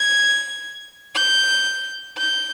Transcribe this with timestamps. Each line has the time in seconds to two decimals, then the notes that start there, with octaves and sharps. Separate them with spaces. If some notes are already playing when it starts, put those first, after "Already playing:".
Already playing: G#6
1.15 G6
2.18 G6